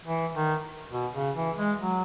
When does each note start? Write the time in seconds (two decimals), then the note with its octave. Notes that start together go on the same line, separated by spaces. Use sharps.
0.05 E3
0.34 D#3
0.92 B2
1.15 C#3
1.35 E3
1.57 G#3
1.80 F#3